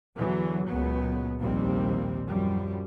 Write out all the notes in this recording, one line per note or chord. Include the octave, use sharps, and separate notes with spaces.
E2 D3 E3 F#3
C#2 A#2 F#3 B3
A#1 D#2 C3 G3 A#3 C4
F#2 F3 G3